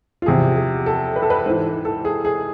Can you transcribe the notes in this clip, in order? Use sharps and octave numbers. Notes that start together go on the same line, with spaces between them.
F4
E2 C3 F3 G#4
G#4
A4
B4
A4
B4
G#2 E3 C5
A4
G#4
G#4